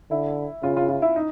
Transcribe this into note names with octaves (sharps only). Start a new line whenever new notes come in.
D3 E4
C#3 F4
F4
F4
E4
D#4